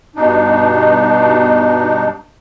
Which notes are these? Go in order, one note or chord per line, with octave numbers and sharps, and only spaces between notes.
G2 B2 D4 D#4